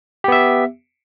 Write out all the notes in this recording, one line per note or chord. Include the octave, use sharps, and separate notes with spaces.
B3 G4 E5